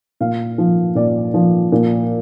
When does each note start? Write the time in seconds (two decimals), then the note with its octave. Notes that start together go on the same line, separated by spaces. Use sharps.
0.20 A#2 F5
0.58 F3
0.95 A#2 D5
1.34 F3
1.72 A#2